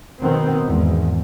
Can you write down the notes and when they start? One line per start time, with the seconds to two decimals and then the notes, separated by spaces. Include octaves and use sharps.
0.23 B2 D#3 B3 C4
0.66 G#1 E2 G#2